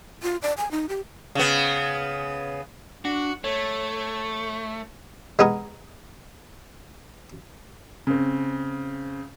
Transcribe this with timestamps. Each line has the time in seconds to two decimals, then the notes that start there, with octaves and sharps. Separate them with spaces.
0.23 F4
0.42 D5
0.58 G#5
0.71 D#4
0.89 G4
1.35 C#3 B3
3.05 D4 F#4
3.44 A3 C#5
5.39 G#3 B3 G#4 A#4
8.07 C#3 C4